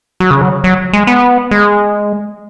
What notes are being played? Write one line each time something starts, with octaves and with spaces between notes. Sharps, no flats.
F#3
C#3
F#3
F#3
G#3
B3
G#3